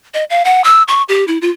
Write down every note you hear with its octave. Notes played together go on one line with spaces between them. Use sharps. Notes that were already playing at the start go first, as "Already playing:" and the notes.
D#5
F5
F#5
E6
C#6
G4
E4
F4